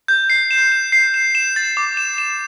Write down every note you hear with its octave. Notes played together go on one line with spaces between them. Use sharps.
G6
C7
E7
E7
C7
E7
E7
A6
D6
E7
E7